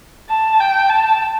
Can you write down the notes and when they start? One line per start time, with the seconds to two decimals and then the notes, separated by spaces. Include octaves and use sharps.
0.29 A5
0.60 G5
0.89 A5